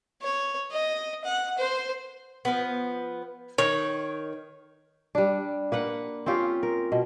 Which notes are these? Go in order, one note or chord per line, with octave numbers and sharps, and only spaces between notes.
C#5
D#5
F#5
C5
F3 B3
D#3 C#5
G3 D4
A#3 B4 F#5
C4 C#4 F4 G4
A#4
B2